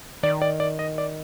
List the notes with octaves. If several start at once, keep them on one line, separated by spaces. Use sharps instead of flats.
D#3 D5
D5
D5
D#5
D5